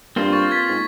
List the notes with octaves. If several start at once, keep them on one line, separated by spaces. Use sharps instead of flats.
G2 A#3 C4 F4 C5
C#6 A6
G#6 B6
G#2